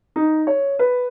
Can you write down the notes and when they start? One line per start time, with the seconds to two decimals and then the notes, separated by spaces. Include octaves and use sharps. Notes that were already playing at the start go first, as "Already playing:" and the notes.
0.16 D#4
0.47 C#5
0.79 B4